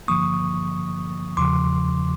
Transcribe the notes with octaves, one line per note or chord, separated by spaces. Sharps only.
G2 D3 F3 A#3 C#6 D#6
E2 C#3 F3 C6 D6